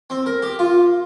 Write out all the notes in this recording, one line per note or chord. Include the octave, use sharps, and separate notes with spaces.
C4
A#4
G4
F4